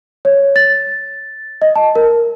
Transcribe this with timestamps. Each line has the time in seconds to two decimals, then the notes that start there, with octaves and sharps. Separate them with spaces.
0.25 C#5
0.56 A6
1.62 D#5
1.76 A5
1.96 A#4